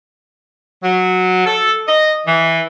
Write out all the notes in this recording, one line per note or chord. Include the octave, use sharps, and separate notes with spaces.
F#3
A4
D#5
E3